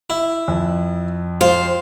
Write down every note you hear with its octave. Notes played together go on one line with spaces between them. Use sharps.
E4
F2
F4 C5